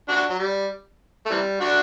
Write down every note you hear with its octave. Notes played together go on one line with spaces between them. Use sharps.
D4 F#4
F#3
G3
A3
C3 E3 G3
D4 F#4